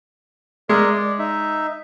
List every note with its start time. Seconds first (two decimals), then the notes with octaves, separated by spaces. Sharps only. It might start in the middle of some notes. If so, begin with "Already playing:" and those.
0.69 G#3 A#4 D5 E5
0.93 D5
1.19 D#4 E5